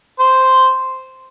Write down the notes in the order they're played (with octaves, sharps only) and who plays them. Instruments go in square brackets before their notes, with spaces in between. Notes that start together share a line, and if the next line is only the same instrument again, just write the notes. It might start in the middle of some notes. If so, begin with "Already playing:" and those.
[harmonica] C5